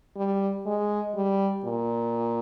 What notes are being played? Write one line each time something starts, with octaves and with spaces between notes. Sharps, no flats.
G3
G#3
G3
A#2